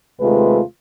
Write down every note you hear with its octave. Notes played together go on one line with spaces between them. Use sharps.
D#2 C3 G#3 A3 F4 B4